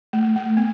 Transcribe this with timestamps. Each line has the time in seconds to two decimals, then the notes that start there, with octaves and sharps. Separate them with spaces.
0.13 A3
0.36 A3
0.57 B3